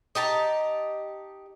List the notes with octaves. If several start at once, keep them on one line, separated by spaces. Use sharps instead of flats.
D#4 G4 A5 A#5